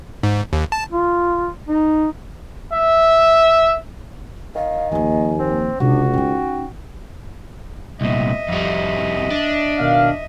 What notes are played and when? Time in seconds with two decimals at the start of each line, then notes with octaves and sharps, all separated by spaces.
0.23 G#2
0.53 D#2
0.72 A5
0.92 F4
1.68 D#4
2.73 E5
4.55 D#3 F5
4.92 D#2 F3 A#3 G#5
5.39 C4
5.80 C#2 C3 D4 F#4
6.13 C#4 D#4 G5
8.01 C2 A#2 D#5 E5
8.48 F2 G3
9.30 D4
9.79 B2 D#3 F5